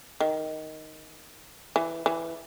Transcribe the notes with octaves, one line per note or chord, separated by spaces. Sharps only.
D#3
E3
E3